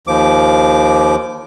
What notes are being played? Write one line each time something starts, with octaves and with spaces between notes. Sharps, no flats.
D#2 F3 D6